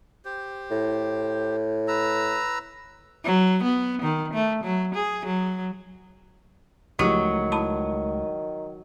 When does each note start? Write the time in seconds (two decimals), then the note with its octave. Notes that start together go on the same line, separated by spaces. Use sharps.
0.25 G4 C5
0.71 A2
1.88 B4 A#5 E6
3.24 F#3
3.63 B3
4.02 D#3
4.34 A3
4.64 F#3
4.95 G#4
5.25 F#3
6.99 C#2 D#3 F3 F#3 A3 E4 G4
7.52 E4 A5 B5